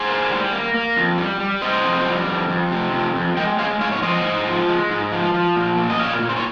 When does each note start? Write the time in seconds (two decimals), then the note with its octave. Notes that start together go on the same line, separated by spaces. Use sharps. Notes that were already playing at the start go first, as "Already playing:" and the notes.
Already playing: G#4 C5
0.09 A#3
0.31 G3
0.53 A#3
0.74 A#3
0.97 F2
1.18 G3
1.40 G3
1.62 C3 C5 D#5
1.84 F2
2.06 G3
2.27 F2
2.50 F2
2.72 C3
2.93 F2
3.15 F2
3.37 G#3 D#5 G5
3.59 G#3 C#5 F5
3.81 G#2 C#5 F5
3.92 C#5
4.03 F3 C5 D#5
4.24 G#2
4.46 F3
4.69 G#3
4.90 G#2
5.12 F3
5.34 F3
5.56 A#2
5.78 A#2
5.90 D#5
6.00 A#2 C#5 F5
6.22 A#2
6.29 C5
6.36 C#5